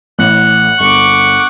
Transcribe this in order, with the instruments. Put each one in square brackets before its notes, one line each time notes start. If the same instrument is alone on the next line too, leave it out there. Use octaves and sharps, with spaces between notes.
[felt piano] A1 A2 [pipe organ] F#5 F#6
[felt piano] G1 [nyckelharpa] C#6 D6